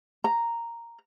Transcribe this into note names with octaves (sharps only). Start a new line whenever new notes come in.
A#5